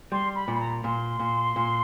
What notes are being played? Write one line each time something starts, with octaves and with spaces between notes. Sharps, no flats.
G3 C6
B5
A#2
B5
A#5
A#2 C6
A#2
A#2